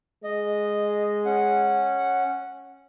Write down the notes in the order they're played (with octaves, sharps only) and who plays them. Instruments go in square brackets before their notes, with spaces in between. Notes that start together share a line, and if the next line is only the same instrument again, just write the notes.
[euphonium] G#3 [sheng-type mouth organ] D#5
[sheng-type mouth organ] C#4 F#5